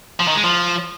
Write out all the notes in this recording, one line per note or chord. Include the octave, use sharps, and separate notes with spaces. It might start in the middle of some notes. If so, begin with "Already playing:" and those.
F3
D#3
G#3
F3